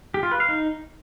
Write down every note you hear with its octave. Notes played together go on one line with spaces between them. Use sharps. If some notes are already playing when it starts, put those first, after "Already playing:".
G4
F4
B4
F5
D#4